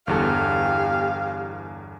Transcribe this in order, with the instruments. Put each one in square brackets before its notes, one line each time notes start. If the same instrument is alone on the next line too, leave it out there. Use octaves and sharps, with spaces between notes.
[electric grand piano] G1 E2 A4 [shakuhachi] G4 [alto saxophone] F5